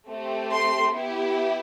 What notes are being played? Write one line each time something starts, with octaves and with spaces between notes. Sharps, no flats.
A3 C4 G4
C6
B3 E4 G4